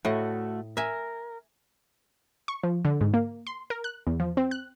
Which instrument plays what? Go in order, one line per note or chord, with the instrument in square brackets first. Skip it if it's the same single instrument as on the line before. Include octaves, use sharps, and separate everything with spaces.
[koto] A2 D#5 [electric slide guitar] A3 F#4
[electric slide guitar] A#4 [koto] E5 G#5
[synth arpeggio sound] C#6
F3
D3
G#2
A#3
C6
A#4
F#6
E2
F3
C4
F#6